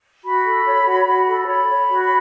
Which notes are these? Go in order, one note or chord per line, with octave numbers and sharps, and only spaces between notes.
F#4 B5
A4
C#5
F#4
F#4
A4
C#5 B5
C#5
F#4